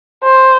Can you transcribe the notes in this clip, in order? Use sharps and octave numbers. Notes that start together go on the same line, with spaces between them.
C5